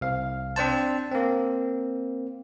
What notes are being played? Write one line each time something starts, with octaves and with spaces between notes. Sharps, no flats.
C2 F5
C4 D4 C5 A5
A#3 C4